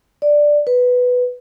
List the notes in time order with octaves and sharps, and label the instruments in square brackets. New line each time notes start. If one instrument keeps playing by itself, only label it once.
[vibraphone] D5
B4